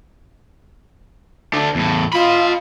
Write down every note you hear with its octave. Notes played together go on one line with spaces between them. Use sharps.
A3 D4
E2 A2
F4 D#5 B5